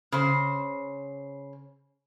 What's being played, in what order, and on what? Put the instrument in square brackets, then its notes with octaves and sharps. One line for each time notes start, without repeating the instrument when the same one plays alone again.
[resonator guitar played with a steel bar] C#3 C5